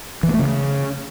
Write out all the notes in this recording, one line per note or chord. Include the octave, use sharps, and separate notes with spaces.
E3
A#3
A3
C#3